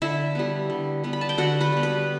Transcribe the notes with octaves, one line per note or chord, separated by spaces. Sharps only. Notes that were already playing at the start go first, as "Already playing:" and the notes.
D3 E4 E5
G3 B3
D3
G3 B3
B5
A5
G5
D3 F#4 F#5
B4 B5
G3 B3
B4 B5